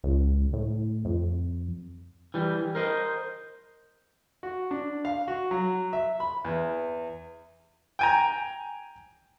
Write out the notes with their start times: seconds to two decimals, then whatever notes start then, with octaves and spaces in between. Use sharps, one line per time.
0.04 C#2
0.53 A2
1.05 F2
2.34 E3 G3
2.75 A#4 C5 D#5
4.43 F#4
4.71 D4
5.05 F5
5.28 F#4
5.51 F#3
5.93 E5
6.20 B5
6.45 E2
7.99 G5 G#5 A#5